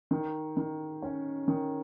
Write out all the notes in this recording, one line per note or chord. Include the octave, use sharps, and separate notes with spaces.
D#3
D#3
C#4
D#3